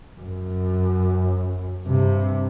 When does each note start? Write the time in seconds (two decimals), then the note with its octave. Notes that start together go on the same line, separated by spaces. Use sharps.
0.20 F#2
1.85 G2 C3